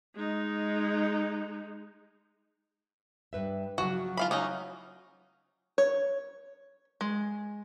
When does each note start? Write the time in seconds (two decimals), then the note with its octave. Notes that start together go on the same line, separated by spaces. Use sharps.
0.15 G#3 D#4
3.33 G2 B4 E5
3.78 C#3 F3 F#3 F#4
4.17 F4 F5 B5
4.31 F#3 C#4 D#4
5.78 C#5
7.01 G#3